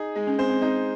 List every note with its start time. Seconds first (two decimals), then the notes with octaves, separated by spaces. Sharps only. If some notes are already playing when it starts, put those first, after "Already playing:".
Already playing: D#4 G#4
0.15 G#3
0.27 C#4
0.39 C4 C5
0.50 C4
0.62 C4 D#4